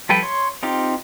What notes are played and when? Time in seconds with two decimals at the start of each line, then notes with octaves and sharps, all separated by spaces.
0.09 F3 G3 A4 B4 G5
0.22 C#5 C6
0.63 C4 D#4 F4 G4